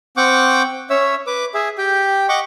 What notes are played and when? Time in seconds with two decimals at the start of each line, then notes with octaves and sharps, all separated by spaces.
0.17 C4 F#5 G5 C#6 D6
0.90 C#4 C#5 E5 E6
1.27 B4 D6
1.54 G#4 E5
1.78 G4 G5
2.29 D#5 F#5 C#6 D6